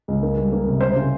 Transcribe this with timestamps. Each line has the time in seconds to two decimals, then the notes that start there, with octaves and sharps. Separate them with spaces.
0.08 C#2
0.22 A#3
0.37 G3
0.52 A#3
0.67 C3
0.81 C#3 C5
0.96 C#3